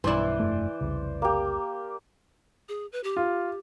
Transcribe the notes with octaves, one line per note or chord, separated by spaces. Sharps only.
B1 G2 E3 E4 C5 D5
F1 G2 A3
F1 C2 C#3
A#3 G4
G#4
B4
G4
F4